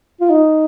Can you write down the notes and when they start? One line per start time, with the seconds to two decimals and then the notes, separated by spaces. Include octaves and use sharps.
0.21 F4
0.30 D#4